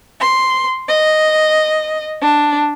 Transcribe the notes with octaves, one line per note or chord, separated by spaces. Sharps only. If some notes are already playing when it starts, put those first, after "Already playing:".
C6
D#5
D4